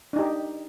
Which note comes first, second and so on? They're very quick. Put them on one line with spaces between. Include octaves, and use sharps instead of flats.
D4 D#4 G4